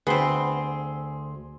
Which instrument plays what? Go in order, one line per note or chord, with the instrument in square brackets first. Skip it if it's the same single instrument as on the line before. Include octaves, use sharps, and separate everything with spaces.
[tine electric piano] D2 C6 [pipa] B3 C4 [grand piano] G#4 B5